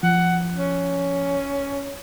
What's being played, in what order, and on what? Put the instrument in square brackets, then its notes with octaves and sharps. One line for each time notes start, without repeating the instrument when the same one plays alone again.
[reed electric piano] F3 [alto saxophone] F#5
[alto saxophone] C#4